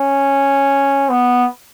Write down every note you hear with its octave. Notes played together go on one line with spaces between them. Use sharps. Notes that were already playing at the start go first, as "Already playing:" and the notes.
Already playing: C#4
B3